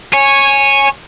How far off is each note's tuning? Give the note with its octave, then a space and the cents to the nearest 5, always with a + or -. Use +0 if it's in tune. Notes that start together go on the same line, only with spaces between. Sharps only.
C#5 -10 G#5 +0